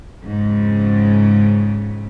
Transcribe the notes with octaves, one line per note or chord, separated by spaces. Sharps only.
F2 G#2 C#3